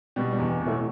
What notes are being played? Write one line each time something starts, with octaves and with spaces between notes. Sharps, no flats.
B2 G3
G3
E2
B2
A2 A3